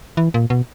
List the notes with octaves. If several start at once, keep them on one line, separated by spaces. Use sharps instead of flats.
E3
A#2
B2